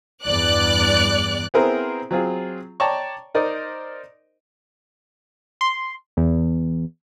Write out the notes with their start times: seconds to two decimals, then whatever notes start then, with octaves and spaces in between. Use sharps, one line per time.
0.24 E2 G2 D5 F#6
1.54 B3 C4 E4 G#4 A#4 C5
2.11 F#3 C4 F4 G#4
2.80 C#5 D5 G5 A5 A#5 C#6
3.35 D#4 A#4 C5 D5 D#5
5.61 C6
6.17 E2